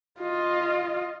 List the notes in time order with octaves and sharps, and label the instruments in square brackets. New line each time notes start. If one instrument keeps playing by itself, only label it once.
[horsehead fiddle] F4 D#5